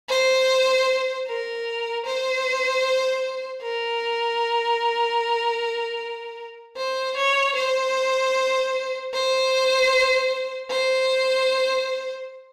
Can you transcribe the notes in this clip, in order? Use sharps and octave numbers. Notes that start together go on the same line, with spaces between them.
C5
A#4
C5
A#4
C5
C#5
C5
C5
C5